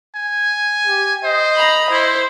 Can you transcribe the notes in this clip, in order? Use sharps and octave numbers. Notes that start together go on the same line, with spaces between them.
G#5
G4
C5 D#5
A#5 B5
E4 C5